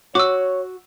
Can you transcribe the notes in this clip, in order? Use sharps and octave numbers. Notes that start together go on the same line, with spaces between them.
F#4 C#5 D6 E6